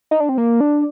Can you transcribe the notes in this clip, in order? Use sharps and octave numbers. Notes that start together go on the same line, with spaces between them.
D#4
D4
C4
A#3
D4